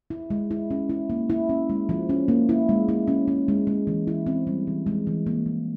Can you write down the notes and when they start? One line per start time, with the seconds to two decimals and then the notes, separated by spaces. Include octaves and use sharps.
0.10 E4
0.30 G#3
0.51 E4
0.71 C#4
0.90 E4
1.10 A#3
1.30 E4
1.49 C#4
1.70 G#3
1.89 F3
2.09 C#4
2.28 A#3
2.49 E4
2.69 G#3
2.89 E4
3.08 C#4
3.28 C#4
3.48 G#3
3.67 G#3
3.87 E3
4.07 E4
4.27 C4
4.47 G3
4.67 E3
4.87 G#3
5.07 E3
5.27 A#3
5.46 F3